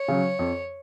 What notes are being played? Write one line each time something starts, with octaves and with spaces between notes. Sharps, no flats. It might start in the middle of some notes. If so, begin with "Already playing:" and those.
Already playing: C#5
C#3 F#3
F2